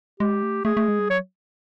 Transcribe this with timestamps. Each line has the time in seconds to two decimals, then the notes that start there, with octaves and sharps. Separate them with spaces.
0.20 G#3 G4
0.43 A3
0.65 A3 G#4
0.77 A3
0.88 G#3
0.99 G3
1.10 F#3 C#5